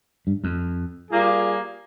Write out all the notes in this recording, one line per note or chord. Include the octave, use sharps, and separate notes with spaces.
G2
F2
G3 A#3 F4 G#4